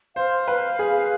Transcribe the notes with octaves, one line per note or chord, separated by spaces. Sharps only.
C5 F5
B4
G#4